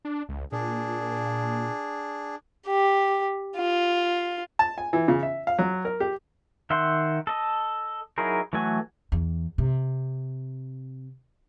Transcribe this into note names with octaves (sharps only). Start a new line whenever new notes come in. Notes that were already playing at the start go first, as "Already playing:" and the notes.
D4
C#2
A#2 D4 G#4
G4
F4
A5
G#5
E3
C#3
E5
F5
F#3
A#4
G4
D#3 E5 F#5 G5 C6
A4 D#5
F#3 D#4 E4 G#4 A#4
E3 F#3 A3 F#4 G#5
E2
C3